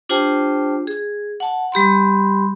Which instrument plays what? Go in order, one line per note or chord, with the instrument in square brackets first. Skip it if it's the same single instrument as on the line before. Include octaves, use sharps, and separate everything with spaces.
[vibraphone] D4 F4 G4 C5 G5 A5
G#4
F#5 A5
G3 G4 B5 C6